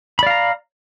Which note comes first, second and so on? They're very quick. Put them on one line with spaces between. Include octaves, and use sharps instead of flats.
B5 D5 F5 A#5